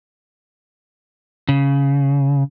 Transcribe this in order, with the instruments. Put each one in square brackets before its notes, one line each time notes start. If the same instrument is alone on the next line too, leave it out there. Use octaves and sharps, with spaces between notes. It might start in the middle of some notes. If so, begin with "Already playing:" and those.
[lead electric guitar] C#3